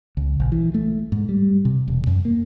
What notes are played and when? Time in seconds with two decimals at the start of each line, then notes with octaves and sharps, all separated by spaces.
0.17 C#2
0.40 A#1
0.52 E3
0.74 A3
1.12 G#2
1.29 G3
1.65 C3
1.88 E1
2.07 F#2
2.25 A#3